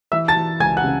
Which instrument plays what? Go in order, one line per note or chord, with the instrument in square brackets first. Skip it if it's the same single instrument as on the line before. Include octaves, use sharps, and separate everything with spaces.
[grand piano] E3 E5 E6
A5 A6
E3
C#2 G#5 G#6
F#5 F#6
C#3